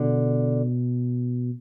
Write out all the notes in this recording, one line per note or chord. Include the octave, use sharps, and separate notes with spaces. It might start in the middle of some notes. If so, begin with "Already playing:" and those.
Already playing: B2 D3